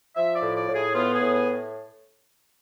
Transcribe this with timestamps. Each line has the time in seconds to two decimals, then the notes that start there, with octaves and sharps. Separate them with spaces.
0.16 F3 E5
0.35 D5
0.42 A2
0.55 D5
0.68 A2
0.74 G#4
0.95 B3 F4
1.13 G#4
1.20 A2
1.33 G#4